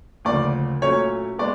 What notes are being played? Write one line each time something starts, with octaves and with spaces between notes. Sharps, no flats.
D2 C#3 F3 A#3 D5
A#2 F#3 A3 C#4 C#5
G#3 B3 D5